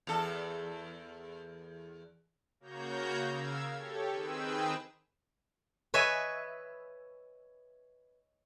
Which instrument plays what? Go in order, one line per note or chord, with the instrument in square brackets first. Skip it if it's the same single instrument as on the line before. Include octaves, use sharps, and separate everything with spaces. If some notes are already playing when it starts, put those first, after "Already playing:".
[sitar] E2 A4
[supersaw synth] C#3 A#3 F#4 C#5 A#5 G6
C#3 A#4 F5 E6 G#6
G4 A4 C#5
D#3 C4 G#4 B4 G5 E6
[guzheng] B4 C#5 D#5 E5 G#5